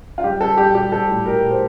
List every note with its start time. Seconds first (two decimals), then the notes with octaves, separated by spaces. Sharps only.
0.18 F4
0.24 G3 G4
0.40 G3 A4
0.57 G3 G4
0.75 G3 G4
0.92 G3 A4
1.09 A2
1.26 G3 A#4
1.44 A2
1.51 C5